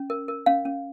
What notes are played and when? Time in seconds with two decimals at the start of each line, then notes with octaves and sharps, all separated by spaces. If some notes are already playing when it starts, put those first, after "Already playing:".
Already playing: C#4
0.10 A#4
0.28 A#4
0.46 C#4 F5
0.65 C#4